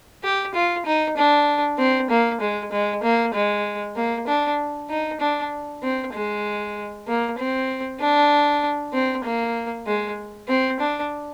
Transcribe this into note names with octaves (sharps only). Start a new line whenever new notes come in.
G4
F4
D#4
D4
C4
A#3
G#3
G#3
A#3
G#3
A#3
D4
D#4
D4
C4
G#3
A#3
C4
D4
C4
A#3
G#3
C4
D4